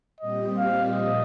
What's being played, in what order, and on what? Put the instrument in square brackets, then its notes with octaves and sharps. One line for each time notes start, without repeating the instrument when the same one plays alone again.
[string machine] A#2 G3 C4 G4 [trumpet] D#5
[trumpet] F5
[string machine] A#2 F3 A#3 [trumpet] D#5